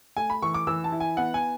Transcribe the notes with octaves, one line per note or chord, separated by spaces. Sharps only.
A3 G#5
B5
E3 C#6
D6
E3 E6
A5
E4
G#5
B3 F#5
G#5